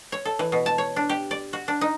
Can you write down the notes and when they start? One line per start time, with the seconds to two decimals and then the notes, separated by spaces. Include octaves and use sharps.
0.12 C#5
0.25 A4
0.39 E3
0.52 B2
0.66 A5
0.78 C#5
0.96 D4
1.09 G4
1.31 D5
1.53 F#4
1.68 D4
1.81 D#4